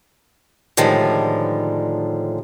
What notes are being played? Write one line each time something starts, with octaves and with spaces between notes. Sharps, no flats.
A2 D3 D#3 F3 G3 G#3